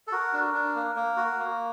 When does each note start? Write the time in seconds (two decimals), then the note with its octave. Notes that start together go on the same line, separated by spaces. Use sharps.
0.07 A4
0.12 F#4 A#4
0.33 D4
0.54 D4
0.76 A#3
0.96 A#3
1.17 F#4
1.39 A#3